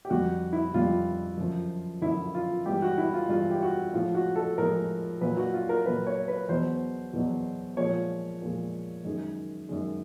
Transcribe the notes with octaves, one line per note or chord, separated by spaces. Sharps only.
G4
F2 D3 G3 F#4
E4
F2 D3 G3 F4
F#2 D3 F3
F#2 D3 F3 E4
F4
G2 E3 G#3 G4
F#4
E4
F4
G2 E3 G#3 F4
G4
F#4
A2 F3 G#3 F4
F#4
A4
A2 F3 G#3 A#4
A#2 F#3 B4
F#4
F4
A#4
A#2 F#3 B4
C#5
B4
E2 B2 F#3 C5
E2 B2 F#3
A#2 F3 G#3 C#5
A#2 F3 G#3
F#2 D#3 G#3
F#2 D#3 G#3